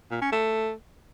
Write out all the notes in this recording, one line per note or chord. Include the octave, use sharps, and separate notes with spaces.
A#2
C#4
A3